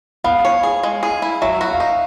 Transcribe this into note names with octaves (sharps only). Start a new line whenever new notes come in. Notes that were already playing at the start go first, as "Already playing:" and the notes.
B3 F5
C#5
G#4
G#3
G#4
E4
F#3 E5
F#4
F5
D#4